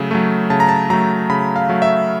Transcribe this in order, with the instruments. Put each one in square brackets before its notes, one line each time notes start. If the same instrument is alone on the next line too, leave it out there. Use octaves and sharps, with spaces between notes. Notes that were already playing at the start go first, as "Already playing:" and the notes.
Already playing: [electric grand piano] C#3 F#3 A3
F#3 A3
C#3 A5
A#5
A5
F#3 A3 A#5
C#3 B5
F5
F#3 A3
E5